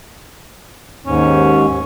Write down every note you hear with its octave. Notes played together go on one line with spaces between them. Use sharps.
D#2 G#2 C#4